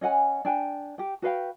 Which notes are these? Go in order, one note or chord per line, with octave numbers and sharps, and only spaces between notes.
C#4 D#5 F#5 G#5
D4 G5 G#5
G4 G5
F#4 B4 F5 G5